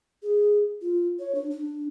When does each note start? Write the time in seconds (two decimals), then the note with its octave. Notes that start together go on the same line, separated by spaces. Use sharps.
0.23 G#4
0.81 F4
1.19 C#5
1.35 D4
1.51 D4